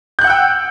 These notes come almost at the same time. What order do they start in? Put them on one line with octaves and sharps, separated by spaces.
G6 F#6 F#5 E6 G5